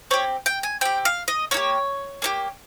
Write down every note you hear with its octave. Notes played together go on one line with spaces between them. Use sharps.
C4 G4 C#5
G5
G#5
C4 G4 G5
F5
D#5
A#3 D#4 C#5
G4
A#3 D#4 G4